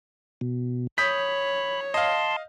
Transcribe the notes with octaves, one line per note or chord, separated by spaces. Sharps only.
B2
C#5 B5 D#6 G6 B6
D#5 F5 A5 C6